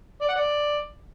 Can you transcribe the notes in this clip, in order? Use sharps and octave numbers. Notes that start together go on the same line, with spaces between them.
D5
F#5
D5